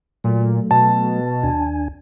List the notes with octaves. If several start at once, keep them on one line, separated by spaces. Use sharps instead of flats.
A#2 F#3 A3
B2 A5
D#2 D4 G#5